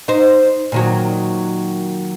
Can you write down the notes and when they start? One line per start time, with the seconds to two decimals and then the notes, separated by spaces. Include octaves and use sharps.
0.08 D#4 C5
0.72 A#2 D#3 F#3